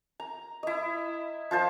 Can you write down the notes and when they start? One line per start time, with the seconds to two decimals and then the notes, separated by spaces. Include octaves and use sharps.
0.20 A#5
0.63 E4 D#5
1.51 F3 F4 C5 A5